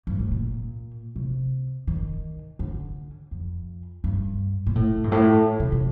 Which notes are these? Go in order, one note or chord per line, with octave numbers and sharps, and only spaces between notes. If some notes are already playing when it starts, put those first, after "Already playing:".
G2
A2
A#2
C3
D#3
D3
F2
G2
A#2
A2
G2
A2
C3
C3